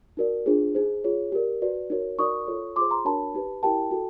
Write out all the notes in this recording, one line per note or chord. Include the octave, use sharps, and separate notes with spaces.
D#4 F#4 A#4 D5
D4 F4 G#4 C5
D#4 G#4 C5
F4 G#4 C#5
G4 A#4 D5
F#4 B4 D5
D#4 F#4 A#4 C#5
D#4 F#4 A#4 D5 C#6 D#6
F4 A4 C#5
F4 G#4 C5 C6 D6
A#5 C6
D4 F#4 A#4 C#5 A5 B5
D#4 G4 B4
E4 G4 A#4 G5 A5
F#4 A4